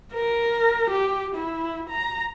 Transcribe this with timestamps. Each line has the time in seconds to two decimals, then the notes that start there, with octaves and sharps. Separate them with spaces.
0.13 A#4
0.89 G4
1.35 E4
1.89 A#5